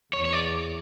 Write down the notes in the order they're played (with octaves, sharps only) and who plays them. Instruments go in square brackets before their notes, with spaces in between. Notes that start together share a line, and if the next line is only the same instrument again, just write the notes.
[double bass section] E2 [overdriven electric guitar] C#5
[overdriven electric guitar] C#5
D5